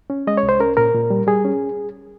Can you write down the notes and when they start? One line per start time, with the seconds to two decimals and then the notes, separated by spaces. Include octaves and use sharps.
0.10 C#4
0.27 G#3 D#5
0.37 C#5
0.43 C2
0.49 C5
0.60 C#4 A#4
0.77 A#2 A#4
0.94 A#2
1.10 G3
1.27 G3 G#4
1.44 C#4